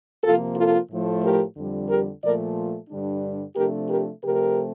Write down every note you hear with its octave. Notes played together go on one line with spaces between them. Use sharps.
C3 F3 A#3 F4 A4
F4 A4
A2 F3 A3
G4 A#4
F2 D3 G3
G4 A#4
A#2 F3 A3 A#4 D5
G2 D3 G3 D4
C3 F3 A3 D4 G4 A#4
G4 A#4
C3 F3 A3 C4 G4 A#4